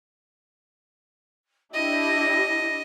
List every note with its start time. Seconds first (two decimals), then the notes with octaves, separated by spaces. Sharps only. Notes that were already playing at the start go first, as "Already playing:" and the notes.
1.74 D4 E4 G4 D#5 A#6